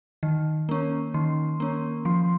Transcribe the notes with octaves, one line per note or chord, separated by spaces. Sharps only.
D#3
A#3 C#4
D#3 C6
A#3 C#4
F3 C6